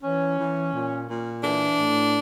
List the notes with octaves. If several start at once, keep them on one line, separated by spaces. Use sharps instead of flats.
E3 C#4
E3
A#2
A#2
E3 D4
A2